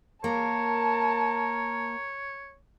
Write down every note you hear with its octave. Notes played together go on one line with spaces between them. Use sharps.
A#3 A#4 C#5 A5